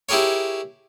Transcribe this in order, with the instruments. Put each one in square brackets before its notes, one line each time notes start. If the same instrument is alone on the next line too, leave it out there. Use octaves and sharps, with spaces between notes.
[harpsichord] E4 G4 G#4 A#4 C#5